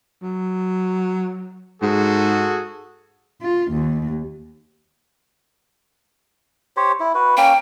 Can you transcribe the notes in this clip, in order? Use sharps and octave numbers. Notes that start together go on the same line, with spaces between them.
F#3
G#2 F#4 G#4 A4
F4
D#2
G4 C5 C#5
E4
F#4 B4
A#3 C#4 G5